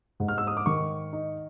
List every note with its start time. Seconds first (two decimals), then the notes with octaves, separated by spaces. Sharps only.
0.20 G#2
0.28 F6
0.38 E6
0.47 D#6
0.57 D6
0.66 D#3 C#6
1.13 D#4